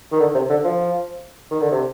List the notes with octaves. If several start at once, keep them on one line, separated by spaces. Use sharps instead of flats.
D#3
D3
C3
D3
F3
D#3
D3
C3